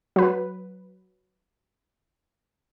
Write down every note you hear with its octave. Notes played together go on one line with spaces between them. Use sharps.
F#3 B4